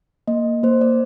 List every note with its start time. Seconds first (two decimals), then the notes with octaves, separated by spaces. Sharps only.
0.28 A#3 D#5
0.63 A#3 C5
0.81 D5